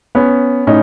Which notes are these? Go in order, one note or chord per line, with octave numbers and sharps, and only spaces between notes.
B3 C#4
A2 C#4 D#4